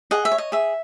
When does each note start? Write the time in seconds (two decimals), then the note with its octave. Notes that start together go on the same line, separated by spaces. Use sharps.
0.11 G#4 D#5 F#5
0.25 E5
0.32 C#5
0.38 D#5
0.52 G#4 E5